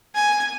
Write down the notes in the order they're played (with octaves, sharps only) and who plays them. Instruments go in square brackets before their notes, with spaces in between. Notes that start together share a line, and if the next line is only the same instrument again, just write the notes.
[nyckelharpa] G#5